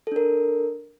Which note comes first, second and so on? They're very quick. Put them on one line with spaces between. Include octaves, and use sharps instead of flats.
A4 D4 A#4